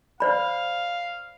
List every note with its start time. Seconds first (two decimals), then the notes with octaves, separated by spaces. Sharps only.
0.20 C5 D5 F5 B5